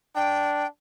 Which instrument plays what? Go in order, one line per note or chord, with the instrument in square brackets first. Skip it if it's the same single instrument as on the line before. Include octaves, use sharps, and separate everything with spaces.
[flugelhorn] D4 [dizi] G5